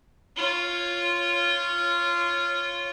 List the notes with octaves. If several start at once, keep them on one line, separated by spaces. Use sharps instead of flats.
F4 C#5